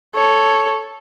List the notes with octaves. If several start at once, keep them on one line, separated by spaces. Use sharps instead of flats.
A4 C#5